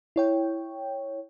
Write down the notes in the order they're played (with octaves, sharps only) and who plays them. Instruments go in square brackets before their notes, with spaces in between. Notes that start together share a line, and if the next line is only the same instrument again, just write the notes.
[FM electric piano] E4 C#5 G5